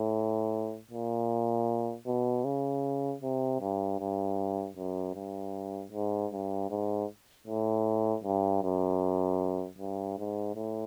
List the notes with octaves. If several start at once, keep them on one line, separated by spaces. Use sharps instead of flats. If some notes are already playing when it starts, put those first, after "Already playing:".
Already playing: A2
A#2
B2
C#3
C3
G2
G2
F#2
G2
G#2
G2
G#2
A2
G2
F#2
G2
G#2
A2